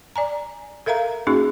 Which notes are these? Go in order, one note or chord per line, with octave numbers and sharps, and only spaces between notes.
D5 G#5 A#5
A4 A#4 E5 F5 A#5
A#3 C#4 D#4 F#4 G#4